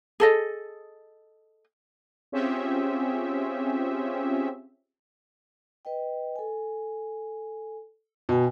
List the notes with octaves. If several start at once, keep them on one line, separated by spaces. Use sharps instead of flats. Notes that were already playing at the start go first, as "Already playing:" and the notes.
G#4 A4 D#5
C4 C#4 F4 G4 G#4 E5
B4 D#5 G5
A4 G#5
B2 B3 G5 G#5